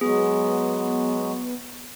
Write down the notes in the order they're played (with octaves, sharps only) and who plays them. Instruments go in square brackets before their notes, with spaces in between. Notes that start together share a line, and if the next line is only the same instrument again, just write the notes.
[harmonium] F#3 G#3 F#4 [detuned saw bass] B3 [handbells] G#4